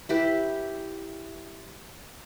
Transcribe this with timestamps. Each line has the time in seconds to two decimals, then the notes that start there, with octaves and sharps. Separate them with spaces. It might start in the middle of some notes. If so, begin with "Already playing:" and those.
0.09 E4 G4 B4